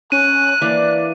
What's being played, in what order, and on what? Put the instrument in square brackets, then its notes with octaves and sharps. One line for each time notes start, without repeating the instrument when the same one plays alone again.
[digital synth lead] C#4 [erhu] F#6 [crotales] D#7
[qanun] E3 A#3 D4 [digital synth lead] D5